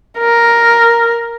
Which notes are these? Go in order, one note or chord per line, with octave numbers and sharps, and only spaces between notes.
A#4